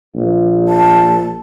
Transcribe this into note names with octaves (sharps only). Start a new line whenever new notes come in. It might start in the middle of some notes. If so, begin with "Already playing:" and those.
A#1
A5